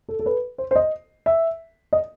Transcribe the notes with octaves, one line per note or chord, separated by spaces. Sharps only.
A4
A4
B4
C5
C5
D#5
E5
D#5